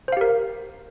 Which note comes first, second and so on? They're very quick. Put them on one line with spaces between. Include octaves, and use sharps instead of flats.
C5 F5 G4 A#4